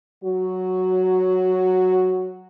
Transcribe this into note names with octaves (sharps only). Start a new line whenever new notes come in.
F#3 F#4